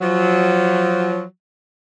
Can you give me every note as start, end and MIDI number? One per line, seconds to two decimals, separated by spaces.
0.01 1.23 53
0.01 1.23 54